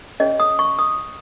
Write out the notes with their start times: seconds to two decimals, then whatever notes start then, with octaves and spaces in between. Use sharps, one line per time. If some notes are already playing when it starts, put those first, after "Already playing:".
0.20 C#4 G#4 C#5 D#5
0.40 D#6
0.59 C#6
0.79 D#6